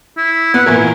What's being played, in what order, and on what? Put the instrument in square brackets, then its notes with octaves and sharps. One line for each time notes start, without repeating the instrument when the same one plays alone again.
[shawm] E4
[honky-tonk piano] B3 [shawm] F#5
[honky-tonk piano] A#2 E3 A#4 [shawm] G#5